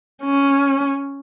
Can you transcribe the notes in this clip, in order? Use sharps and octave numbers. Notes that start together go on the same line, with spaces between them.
C#4